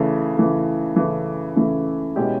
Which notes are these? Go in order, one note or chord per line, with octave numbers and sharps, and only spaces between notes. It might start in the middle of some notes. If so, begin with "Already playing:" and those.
Already playing: C#3 E3 A3
C#3 E3 A3
C#3 E3 A3
C#3 E3 A3
B2 G#3 C#4 E4 G4